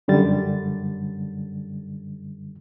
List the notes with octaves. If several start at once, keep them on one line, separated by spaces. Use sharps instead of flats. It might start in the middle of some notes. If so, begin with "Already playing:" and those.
F#2 D3 G3 A6